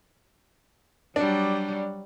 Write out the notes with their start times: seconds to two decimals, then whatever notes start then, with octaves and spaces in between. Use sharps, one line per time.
1.16 F#3 G3 D4